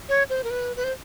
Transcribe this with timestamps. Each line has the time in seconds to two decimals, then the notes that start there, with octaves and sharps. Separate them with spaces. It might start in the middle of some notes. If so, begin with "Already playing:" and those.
0.09 C#5
0.30 C5
0.44 A#4
0.50 B4
0.76 B4
0.84 C5